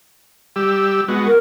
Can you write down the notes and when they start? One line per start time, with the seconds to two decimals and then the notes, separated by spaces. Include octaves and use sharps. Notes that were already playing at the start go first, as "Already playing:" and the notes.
0.56 G3 G4 E6
1.08 G#3 B3 F#4
1.27 A#4